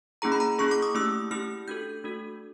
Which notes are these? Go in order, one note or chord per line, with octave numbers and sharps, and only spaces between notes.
A#3 C#4 E4 G#4 A#5
B5
A#5
A#3 C#4 E4 G#4 C#6
D6
D#6
A3 C#4 E4 G4 E6
A3 C#4 E4 G4 F6
A3 D4 F#4 A4 G6
A3 D4 F#4 A4